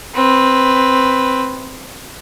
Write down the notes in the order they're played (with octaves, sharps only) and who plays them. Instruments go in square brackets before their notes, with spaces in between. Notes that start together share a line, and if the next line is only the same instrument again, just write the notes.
[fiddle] C4 B4